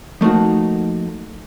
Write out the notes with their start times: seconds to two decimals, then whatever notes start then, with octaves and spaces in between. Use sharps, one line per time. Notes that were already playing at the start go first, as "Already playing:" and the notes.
0.21 F3 A3 A#3 D#4 F#4